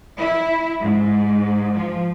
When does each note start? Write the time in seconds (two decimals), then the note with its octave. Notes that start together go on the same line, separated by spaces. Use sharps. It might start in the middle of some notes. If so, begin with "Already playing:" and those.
0.18 E4
0.79 G#2
1.74 F3